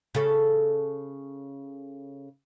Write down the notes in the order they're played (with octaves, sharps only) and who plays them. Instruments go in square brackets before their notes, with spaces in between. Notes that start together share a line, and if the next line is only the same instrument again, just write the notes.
[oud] C#3 A4